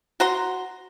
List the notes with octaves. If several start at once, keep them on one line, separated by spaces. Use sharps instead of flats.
F#4 A#5 C6